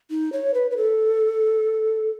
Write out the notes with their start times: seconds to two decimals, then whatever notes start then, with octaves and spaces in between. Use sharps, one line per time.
0.10 D#4
0.32 C#5
0.54 B4
0.71 B4
0.77 A4